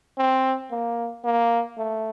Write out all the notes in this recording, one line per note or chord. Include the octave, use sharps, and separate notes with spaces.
C4
A#3
A#3
A3